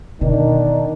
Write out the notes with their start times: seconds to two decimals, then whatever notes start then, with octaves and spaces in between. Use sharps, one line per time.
0.21 B2 D3 D#3 D4